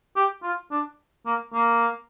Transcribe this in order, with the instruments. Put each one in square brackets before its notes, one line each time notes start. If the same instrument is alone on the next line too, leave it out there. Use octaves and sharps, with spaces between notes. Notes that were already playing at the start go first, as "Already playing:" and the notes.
[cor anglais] G4
F4
D4
A#3
A#3